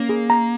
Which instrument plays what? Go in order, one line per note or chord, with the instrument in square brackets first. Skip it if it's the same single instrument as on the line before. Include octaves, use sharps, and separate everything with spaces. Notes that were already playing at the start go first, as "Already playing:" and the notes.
Already playing: [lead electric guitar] A#3 [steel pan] C#4
[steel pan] G#4
A#5